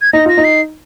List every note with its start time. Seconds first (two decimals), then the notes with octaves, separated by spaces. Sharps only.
0.01 G#6
0.13 D#4 A#6
0.26 F4 A#6
0.37 D#4
0.44 C7